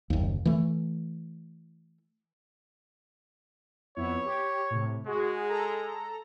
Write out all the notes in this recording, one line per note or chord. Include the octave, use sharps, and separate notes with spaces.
F#1 D#2
E3 A3
F2 B3 E4 C#5
G4
A2 C3
G#3 F#4 G#4
A4 A#5